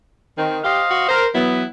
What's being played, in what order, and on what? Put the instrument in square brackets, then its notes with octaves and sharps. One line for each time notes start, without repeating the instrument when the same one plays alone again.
[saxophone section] D#3 [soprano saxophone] C4
[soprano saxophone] G4 [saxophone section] C5 D#5 F5
[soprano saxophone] F#4
[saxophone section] A#4 [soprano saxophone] C5
[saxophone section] E3 F#3 B3 [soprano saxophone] E4